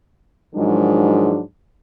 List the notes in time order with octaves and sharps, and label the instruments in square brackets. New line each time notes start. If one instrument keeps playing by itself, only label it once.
[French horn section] G#2 D#3 F3 F#3 G#3 D4